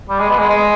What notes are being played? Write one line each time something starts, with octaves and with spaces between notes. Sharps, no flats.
G3
G#3
B3
G#3
G#3